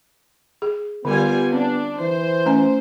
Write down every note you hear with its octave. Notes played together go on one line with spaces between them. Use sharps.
G#4
D3 G3 B3 F4 G#5
C4 D4
E3 C5
A3 C#4 G#5